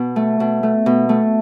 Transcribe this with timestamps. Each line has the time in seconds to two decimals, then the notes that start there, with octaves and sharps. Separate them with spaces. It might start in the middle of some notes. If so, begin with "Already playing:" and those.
Already playing: B2
0.16 A3
0.40 B2
0.63 A3
0.86 B2
1.09 A3